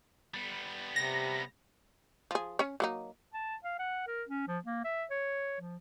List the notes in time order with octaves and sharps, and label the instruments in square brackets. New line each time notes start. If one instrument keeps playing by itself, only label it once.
[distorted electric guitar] G3 B3
[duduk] C3 [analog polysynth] A#6
[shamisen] F3 G#4
C#4 C#5
F#3 A#3 D#4
[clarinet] A5
F5
F#5
A#4
C#4
F3
A#3
E5
C#5
F3